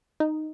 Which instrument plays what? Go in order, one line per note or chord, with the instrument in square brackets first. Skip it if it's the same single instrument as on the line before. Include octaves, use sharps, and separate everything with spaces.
[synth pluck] D#4